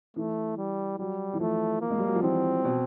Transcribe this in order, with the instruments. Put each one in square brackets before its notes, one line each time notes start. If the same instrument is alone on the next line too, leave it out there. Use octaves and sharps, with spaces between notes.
[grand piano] E3 [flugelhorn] A3
[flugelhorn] G3
[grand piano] F#3 [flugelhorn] G3
[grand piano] E3
[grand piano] F3 [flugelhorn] A3
[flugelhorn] A#3
[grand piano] G#3
G3
F#3
F3
[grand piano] E3 [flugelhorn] C4
[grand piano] B2